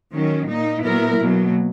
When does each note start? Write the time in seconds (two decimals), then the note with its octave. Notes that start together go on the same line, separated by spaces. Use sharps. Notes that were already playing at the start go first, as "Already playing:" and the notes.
0.13 D#3 F#3 C#4
0.49 A#2 A#3 D#4
0.84 A#2 F#3 B3 E4 A#4
1.20 B2 F#3 A#3